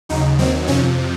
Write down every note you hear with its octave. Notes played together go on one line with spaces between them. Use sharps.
D#2 C#3 F#3 D#4
D#2 D#3 F#3 C4
F2 C3 F3 C#4